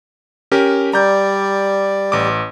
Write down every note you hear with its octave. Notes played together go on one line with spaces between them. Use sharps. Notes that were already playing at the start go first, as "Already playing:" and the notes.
C#4 G4 A#4
G3 D5 A#5 G6
A1 D6